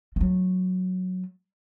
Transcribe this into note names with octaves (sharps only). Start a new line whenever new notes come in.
F#3 A3